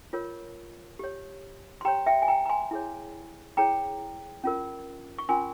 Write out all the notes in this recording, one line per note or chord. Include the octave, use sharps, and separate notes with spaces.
F4 A#4 C#5
G4 C#5
C6
G4 C#5 G5 A#5
E5 G5
G#5
G5 A#5
A#5
G#5 C6
E4 G#4 C#5
E4 G#4 C#5 G5 A#5
C#4 F4 A#4
C#6
C#4 F4 A#4 G#5 C6